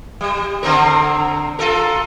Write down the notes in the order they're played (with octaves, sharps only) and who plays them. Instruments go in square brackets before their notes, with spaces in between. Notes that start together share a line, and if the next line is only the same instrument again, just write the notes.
[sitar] G3
D3 C4 A#4
F4 A4 A#4